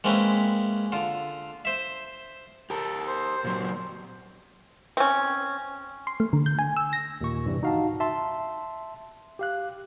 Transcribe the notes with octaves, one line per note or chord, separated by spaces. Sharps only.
G#3 A#3 C4 C#4 E4 B4
D3 F4
C5 E5
G4 A4 A#4
C5
A#2 F#3
C4 C#4
C6
A3
D3
G6
G#5
E6
A#6
D#2 A#2 C#6
G2 C3 E3 G3
D#4 F#4 F5 F#5 A5
E5 A5 C6
G4 F5 F#6